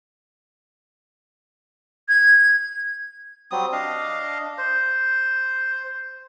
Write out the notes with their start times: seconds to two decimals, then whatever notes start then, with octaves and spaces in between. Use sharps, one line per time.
2.09 G#6
3.51 F#3 G3 C4 D#6
3.72 D4 D#5 F5
4.58 C5